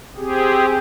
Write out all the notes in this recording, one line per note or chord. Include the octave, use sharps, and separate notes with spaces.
C4 G4 G#4